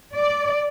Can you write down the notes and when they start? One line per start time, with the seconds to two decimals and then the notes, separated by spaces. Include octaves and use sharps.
0.15 D5